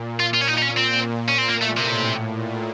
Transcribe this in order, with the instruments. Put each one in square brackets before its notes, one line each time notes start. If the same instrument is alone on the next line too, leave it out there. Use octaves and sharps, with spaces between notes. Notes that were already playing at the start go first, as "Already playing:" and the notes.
Already playing: [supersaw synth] A#2
[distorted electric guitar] F4
F4
C#4
D#4
D#4
C#4
C4
[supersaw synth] A#2
[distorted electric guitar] C#4
C4
[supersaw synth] A#2 [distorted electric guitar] A#3
[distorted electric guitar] A3
[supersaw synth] A2 [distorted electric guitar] C3
[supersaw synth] A#2